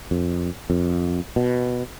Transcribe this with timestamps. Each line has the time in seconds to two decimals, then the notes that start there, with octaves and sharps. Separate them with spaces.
0.11 F2
0.70 F2
1.36 B2